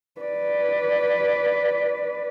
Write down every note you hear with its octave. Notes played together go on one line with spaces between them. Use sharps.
B4 D5